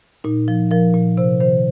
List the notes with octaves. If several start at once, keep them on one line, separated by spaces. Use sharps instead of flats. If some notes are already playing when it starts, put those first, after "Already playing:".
A#2 D#4
F3
F3 A#4
A#2
C3 C5
D#3 C5